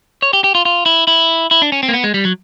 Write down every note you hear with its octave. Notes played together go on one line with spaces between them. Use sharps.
C#5
G4
G4
F4
F4
E4
E4
E4
D4
C#4
C4
A#3
B3
G#3
G3
F#3